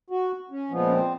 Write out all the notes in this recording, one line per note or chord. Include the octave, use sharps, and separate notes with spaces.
F#4
C#4
A#2 F3 G#3 B3
C#4
C4